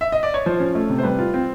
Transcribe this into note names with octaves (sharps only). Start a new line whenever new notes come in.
E5
D#5
D5
C#5
F3 C5
C#4
A3
C3
C5
G3 B4
F4
C4